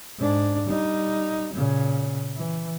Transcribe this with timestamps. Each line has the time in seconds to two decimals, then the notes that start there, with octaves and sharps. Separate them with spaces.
0.18 G#2 D4
0.67 G3 D#4
1.54 A#2 C#3
2.36 E3